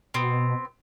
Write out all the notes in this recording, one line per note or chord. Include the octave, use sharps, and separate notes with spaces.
B2 B3 C4